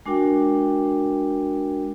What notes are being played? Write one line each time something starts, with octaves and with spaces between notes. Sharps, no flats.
G#3 D4 F#4 A#4 G5